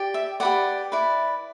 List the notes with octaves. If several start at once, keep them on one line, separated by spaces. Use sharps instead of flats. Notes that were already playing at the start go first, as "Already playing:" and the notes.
Already playing: G4 D5
E5
G4 B4 D5 F#5
E4 B4 D5